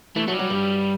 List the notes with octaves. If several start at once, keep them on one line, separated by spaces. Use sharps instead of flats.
E3 A3
F#3 A3
G3
F#3
G2